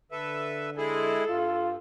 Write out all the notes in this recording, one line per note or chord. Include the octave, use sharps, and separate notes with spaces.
D3 A4 B4 E5
G#3 E4 G#4 A4
G2 F4